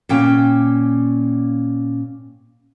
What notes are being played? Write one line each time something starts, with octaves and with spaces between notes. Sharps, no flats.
A#2 C#4 G5